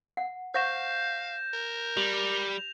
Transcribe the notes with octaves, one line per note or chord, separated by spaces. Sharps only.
F#5
C5 F5 F#5 C#6 G6 A#6 E7
A#4
G3 G4 F7